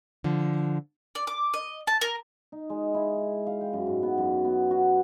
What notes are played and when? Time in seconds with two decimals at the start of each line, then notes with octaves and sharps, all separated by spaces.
0.24 D3 F3
1.15 D5
1.27 D6
1.54 D#5
1.87 A5
2.01 A#4
2.52 D#4
2.70 G#3
2.94 E4
3.47 F5
3.61 G5
3.73 F#2
3.87 G#2
4.03 B3
4.18 F#2
4.45 B3
4.71 F#4